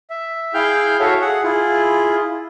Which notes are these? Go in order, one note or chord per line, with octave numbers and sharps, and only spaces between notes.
E5
E4 G#4 F5 G5 F6 G6
F#4 A4 C#5 E5 F5
G#4 F#5
E4 F4 G#4